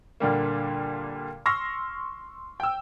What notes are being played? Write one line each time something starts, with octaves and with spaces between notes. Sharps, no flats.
A#2 D3 G3 A#3
C6 C#6 E6 F6 A#6
G5 E6